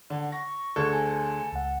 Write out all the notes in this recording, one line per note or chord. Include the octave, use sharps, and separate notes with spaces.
D3 F#5
C#6 A#6
D2 D3 G#4 A4 F#6 G#6
G#5
C#2 F#5